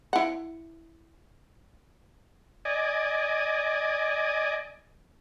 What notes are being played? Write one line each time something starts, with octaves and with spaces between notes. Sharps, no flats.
E4 F#5
D5 D#5 G#5